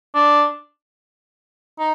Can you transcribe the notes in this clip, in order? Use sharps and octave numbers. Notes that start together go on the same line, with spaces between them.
D4
D#4